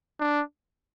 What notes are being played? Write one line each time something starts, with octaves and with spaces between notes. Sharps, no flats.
D4